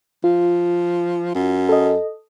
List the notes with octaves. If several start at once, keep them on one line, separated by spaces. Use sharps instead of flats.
F3 F4
F#2
A4 D#5